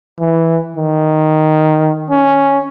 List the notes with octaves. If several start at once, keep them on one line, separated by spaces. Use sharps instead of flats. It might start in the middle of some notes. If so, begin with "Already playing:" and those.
E3
D#3
C#4